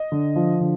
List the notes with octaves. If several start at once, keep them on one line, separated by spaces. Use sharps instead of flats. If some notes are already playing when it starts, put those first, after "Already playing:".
Already playing: D#5
D3
F3
D3